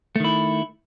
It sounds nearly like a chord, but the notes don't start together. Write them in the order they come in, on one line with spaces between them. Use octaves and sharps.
A3 D#3 E4